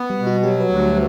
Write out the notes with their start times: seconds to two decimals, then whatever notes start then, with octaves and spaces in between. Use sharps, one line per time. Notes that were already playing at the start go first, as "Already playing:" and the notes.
Already playing: B3
0.10 G3
0.19 B2
0.27 F#4
0.43 F#3 G4
0.60 B4
0.69 D2